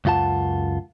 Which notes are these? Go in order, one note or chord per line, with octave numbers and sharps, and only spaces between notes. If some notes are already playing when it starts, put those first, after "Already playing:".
C#2 F#2 F4 F#5 A5